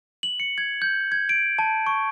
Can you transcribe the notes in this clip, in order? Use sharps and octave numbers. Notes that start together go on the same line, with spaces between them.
F#7
C#7
G#6
G6
G#6
D7
A5
C#6